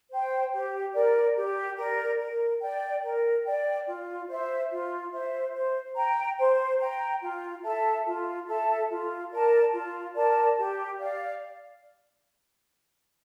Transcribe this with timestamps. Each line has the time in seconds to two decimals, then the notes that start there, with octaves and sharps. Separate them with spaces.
0.09 C5 G5
0.52 G4
0.93 A#4 D5
1.36 G4
1.77 A#4 D5
2.19 A#4
2.61 D5 G5
3.03 A#4
3.45 D5 G5
3.87 F4
4.28 C5 E5
4.70 F4
5.12 C5 E5
5.54 C5
5.96 G5 A#5
6.38 C5
6.79 G5 A#5
7.22 F4
7.64 A4 E5 A5
8.05 F4
8.47 A4 E5 A5
8.90 F4
9.31 A#4 D5 A5
9.72 F4
10.15 A#4 D5 A5
10.57 G4
10.98 D5 F5